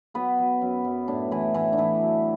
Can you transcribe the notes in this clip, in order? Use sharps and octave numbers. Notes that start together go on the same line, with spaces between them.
F#3 B3 B4
F#3
F#2
F#2
A2 D4
E3 A3 E4
A2 E3 E4
D4
A2 E3 E4
F#3